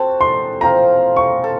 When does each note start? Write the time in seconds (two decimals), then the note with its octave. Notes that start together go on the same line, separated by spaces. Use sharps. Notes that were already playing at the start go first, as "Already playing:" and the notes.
Already playing: C4 F#4 A4 A5
0.21 C6
0.61 F3 C4 F4 A#5
1.16 C#6
1.44 A4